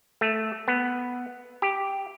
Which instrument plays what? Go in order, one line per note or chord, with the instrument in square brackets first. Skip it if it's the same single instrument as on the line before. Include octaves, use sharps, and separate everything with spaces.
[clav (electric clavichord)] A3
B3
G4